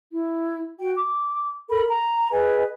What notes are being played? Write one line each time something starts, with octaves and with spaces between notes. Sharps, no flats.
E4
F#4 G5
D6
A4 A#4 B5
A#5
G#4 B4 D#5 G#5